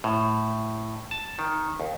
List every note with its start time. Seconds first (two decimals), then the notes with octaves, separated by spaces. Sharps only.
0.04 A2
1.11 A5
1.39 D#3
1.80 D#2